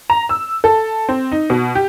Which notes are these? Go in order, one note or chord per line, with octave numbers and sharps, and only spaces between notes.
A#5
E6
A4
C4
D#4
B2
G4